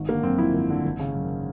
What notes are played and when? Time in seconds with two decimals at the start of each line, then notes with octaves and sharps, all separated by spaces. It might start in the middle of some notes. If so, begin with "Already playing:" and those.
Already playing: G#1
0.09 D3 A#3
0.23 F#2 C4
0.38 F3 E4
0.54 G#1
0.70 D3
0.85 G#1
0.99 C#3
1.15 F#2